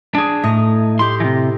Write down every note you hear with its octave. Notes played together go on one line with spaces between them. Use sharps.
D4 G#4
A2 A3 D#5 A#5
E4 G4 C6
C3 E3